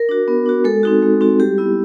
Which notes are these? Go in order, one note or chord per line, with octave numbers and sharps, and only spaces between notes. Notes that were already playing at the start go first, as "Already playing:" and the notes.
Already playing: A#4
D4 F#4
B3
D4 F#4
G#3 A4
C4 D#4 F#4
G#3
C4 D#4 F#4
G3 G4
B3 E4